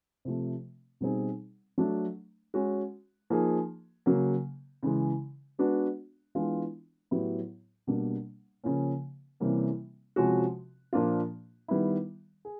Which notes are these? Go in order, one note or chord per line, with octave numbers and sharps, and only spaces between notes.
C3 F3 A3
B2 G3 C4 D#4 G#4
F#3 A3 D4
G#3 C#4 F#4
F3 A#3 D#4 G#4
C#3 F#3 A#3
C#3 E3 G#3
G#3 B3 D4 F#4
E3 G#3 B3 D4 F4
A2 F#3 B3 E4 G4
B2 G3 A#3 D4
C#3 F3 A#3 C#4
C3 E3 G3 A#3 C#4
C3 F3 G#3 C#4 F#4
A#2 F3 A#3 D4 F4
D#3 G3 B3 E4
G#4